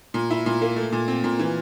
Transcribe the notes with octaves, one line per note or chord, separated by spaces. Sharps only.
A#2
E4
A#2
A#3
A3
A#2
C4
A#2
E3